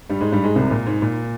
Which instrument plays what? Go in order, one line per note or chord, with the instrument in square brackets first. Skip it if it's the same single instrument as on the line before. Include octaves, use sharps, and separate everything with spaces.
[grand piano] G2 G3
G#2 G#3
G2 G3
G#2 G#3
C2 C3
A#2
G#2
A#2